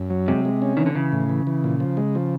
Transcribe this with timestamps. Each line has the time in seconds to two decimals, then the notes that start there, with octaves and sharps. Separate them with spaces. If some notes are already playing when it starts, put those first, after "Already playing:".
Already playing: F#2
0.10 F#3
0.28 C3 G#3
0.45 G#3
0.62 C#4
0.77 D#3 E3
0.86 D3
0.95 C#3 E3
1.12 A2
1.29 E3
1.47 E3
1.64 A#2
1.80 F3
1.97 G#3
2.15 F3